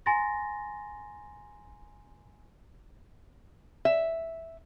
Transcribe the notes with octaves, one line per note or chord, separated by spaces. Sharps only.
G#5 A#5 C6 A6 A#6
E5